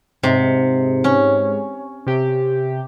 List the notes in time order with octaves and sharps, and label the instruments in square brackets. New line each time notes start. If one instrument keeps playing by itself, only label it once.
[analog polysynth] G#2 [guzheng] C3
[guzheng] C#4
[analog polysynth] C3 G4